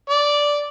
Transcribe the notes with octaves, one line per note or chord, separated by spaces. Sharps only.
D5